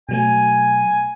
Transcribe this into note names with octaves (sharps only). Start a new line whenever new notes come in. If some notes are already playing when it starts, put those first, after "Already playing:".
B2 F#3 A3 G#5